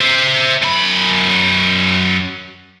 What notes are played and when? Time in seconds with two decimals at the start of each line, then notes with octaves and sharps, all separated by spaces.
0.01 C5 E5
0.62 F#2 B5